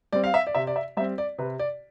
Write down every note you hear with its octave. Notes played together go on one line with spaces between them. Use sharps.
G3 C4 D5
F5
E5
D5
C3 E5
D5
E5
G3 C4 E5
D5
C3 B4
D5